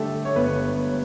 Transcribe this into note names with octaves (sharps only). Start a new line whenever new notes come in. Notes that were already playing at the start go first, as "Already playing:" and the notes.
Already playing: D3 G3 A3 G4 A4
C#5
G1 B3 B4